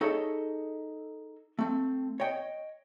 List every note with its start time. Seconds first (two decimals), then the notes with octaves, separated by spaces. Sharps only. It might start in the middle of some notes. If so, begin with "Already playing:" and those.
0.01 D#4 G#4 A4 C#5 D#5 E5
1.59 A3 C4
2.20 C#5 D#5 G5